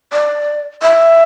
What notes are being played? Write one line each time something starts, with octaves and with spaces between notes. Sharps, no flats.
D5
E5